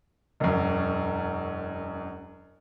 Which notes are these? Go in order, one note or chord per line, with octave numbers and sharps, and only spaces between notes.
E1 F#2